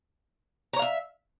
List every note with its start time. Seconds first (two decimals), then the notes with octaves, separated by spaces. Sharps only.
0.73 A#5
0.76 C#5
0.79 F5
0.82 E5